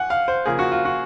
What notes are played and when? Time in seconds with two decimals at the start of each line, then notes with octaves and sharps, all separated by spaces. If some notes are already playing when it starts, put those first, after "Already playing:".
Already playing: F#5 G#5
0.10 F5
0.28 C5
0.45 C#3 F3 A#3 G#4
0.59 F#4
0.72 F4
0.85 F#4